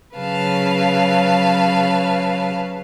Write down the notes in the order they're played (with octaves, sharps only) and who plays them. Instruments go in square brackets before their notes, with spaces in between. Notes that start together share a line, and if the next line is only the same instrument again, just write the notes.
[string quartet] C#3 F#3 B4 F5 A5